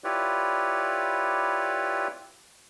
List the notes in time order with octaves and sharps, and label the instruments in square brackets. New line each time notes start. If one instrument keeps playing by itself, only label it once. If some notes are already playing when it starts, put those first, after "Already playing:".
[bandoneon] E4 F4 G4 B4 C#5 D5